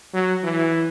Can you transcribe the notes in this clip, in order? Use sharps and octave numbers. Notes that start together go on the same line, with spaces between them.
F#3
E3